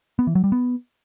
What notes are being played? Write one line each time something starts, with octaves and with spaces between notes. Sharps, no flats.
B3
E3
F#3
G3
B3